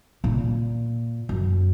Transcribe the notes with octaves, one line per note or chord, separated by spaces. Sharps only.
A#2
F#2